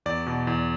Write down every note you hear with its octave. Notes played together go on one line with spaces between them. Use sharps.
E2 D5
B2
E2